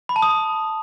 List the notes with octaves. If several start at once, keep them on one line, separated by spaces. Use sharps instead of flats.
B5
A5
D#6
B5